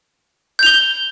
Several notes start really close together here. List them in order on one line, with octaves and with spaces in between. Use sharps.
G6 F7 G7